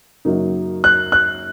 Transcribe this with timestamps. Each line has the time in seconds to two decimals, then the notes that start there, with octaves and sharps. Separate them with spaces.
0.25 F#2 C#3 F#3 A#3 D#4
0.84 F#6
1.12 F#6